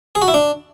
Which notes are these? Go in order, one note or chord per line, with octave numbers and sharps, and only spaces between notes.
G#4
F#4
E4
D4